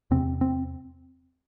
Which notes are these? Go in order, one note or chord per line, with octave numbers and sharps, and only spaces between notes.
E2 C3 C4
C4